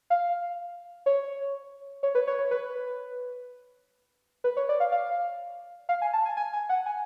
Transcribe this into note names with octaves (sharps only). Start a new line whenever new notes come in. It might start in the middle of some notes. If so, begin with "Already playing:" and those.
F5
C#5
C#5
B4
C#5
C#5
B4
B4
C#5
D5
F5
F5
F5
G#5
A5
G#5
G#5
G#5
F#5
G#5